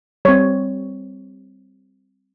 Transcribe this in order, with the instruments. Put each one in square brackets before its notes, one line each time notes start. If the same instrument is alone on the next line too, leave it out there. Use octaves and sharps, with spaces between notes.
[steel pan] G3 C4 C#5